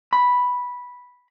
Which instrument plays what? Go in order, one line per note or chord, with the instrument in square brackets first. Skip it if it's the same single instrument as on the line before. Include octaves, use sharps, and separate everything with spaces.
[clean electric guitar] B5